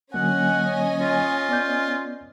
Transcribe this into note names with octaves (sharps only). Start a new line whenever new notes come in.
D3 F#3 A#3 C#4 D#5 F#5 G#5
F4
B3 D5 G6